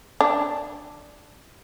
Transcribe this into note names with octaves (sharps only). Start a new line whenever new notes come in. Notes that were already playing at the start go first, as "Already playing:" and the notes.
D4